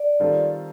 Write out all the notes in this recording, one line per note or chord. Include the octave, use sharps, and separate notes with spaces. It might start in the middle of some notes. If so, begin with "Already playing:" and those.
Already playing: D5
D#3 G3 C4 F4 A4